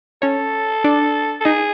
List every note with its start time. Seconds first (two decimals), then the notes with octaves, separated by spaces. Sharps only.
0.22 C#4 A4 C#5
0.84 D4 D5
1.41 A4
1.45 D#4 G#4 D#5